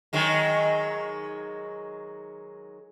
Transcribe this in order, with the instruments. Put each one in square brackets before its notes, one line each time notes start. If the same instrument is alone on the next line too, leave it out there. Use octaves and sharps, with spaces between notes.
[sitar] D#3 F#3 G#3